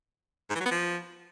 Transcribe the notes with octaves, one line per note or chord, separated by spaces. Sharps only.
G#2
E3
F#3
B3
F3